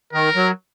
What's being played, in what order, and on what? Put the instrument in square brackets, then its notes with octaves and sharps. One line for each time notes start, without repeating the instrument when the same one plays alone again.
[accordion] D#3 [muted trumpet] A#4
[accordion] F#3